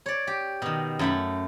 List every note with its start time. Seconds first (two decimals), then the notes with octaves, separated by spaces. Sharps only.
0.06 C#5 D5
0.27 G4
0.62 B2 D#3
0.99 F#2 A3 B5